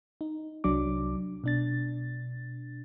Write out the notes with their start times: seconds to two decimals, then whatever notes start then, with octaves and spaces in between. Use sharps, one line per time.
0.21 D#4
0.64 C2 F#3 D4 D6
1.44 B2 D4 A6